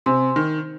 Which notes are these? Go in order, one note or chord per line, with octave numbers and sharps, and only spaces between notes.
C3 C5 G#5 C6
D#3